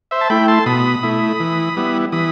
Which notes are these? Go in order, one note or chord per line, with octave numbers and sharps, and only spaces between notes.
C5 E5
A5
A3 E4 G5 B5
A5 C6
B2 B5 D#6
A3 E4
E3
G3 B3 E4
E3 B5 D#6